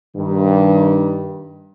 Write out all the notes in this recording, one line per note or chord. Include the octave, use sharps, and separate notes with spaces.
G2 D#3